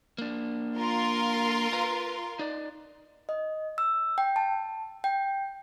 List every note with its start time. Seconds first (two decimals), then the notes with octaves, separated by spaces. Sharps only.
0.18 A#3 D4
0.76 F4 A#4 C6
1.73 B4 A#5
2.39 D#4 D5
3.29 D#5
3.78 E6
4.18 G5
4.36 A5
5.04 G5